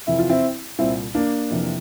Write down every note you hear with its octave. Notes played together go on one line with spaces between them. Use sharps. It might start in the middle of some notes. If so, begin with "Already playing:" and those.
F2 C3 E3 E4
F4
C4 E4
C2 A#2 C4 E4
A#3 D4
F2 C3 E3